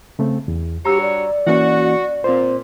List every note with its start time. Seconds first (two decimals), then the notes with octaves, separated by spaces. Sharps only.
0.19 C#3 A3 C4
0.48 E2
0.85 G2 F#4 G4 C#5 A#5 E6
1.01 D5
1.47 E3 A#3 C#4 F#4
2.24 A#2 C4 C5